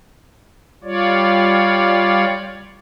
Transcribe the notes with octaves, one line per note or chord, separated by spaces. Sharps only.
G3 F4 C#5 D5